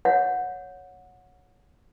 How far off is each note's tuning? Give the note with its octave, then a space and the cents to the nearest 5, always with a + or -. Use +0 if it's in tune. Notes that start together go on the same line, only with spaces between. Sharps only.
C#5 +0 F#5 -20